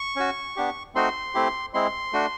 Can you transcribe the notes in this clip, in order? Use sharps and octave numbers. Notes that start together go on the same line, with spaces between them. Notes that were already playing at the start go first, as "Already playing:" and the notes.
Already playing: C#6
C#4 F#4
B3 D4 G4
A3 C4 D#4 F#4 C6
A3 C4 E4 G4
G#3 C4 E4 C6
A3 D4 F#4